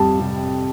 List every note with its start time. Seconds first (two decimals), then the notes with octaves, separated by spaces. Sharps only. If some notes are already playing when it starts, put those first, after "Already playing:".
Already playing: F2 G3 A5
0.20 C3